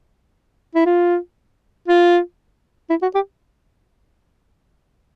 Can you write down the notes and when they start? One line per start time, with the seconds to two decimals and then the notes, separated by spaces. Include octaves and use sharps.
0.75 E4
0.86 F4
1.88 F4
2.90 E4
3.02 F#4
3.15 G4